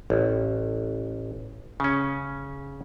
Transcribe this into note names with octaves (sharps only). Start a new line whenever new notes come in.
A1
C#3 C#4